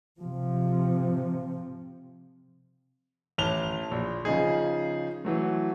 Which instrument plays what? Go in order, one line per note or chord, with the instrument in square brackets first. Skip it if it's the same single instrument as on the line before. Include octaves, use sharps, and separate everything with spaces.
[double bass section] C3 F3
[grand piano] A1 A5 F7 G7
A#1
C#3 F3 D#4 G#4
E3 F#3 A3